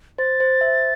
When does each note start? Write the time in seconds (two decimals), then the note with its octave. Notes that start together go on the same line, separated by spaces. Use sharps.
0.18 C5 A6
0.40 C5
0.61 E5